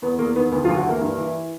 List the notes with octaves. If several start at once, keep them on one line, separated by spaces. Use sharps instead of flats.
E2 B3
E2 A#3
D#3 B3
D2 B3
F3 F4
D2
F#3 F#4
E3 A#3 A#4
G2
E3